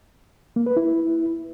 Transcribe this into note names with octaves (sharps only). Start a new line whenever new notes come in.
A#3
B4
E4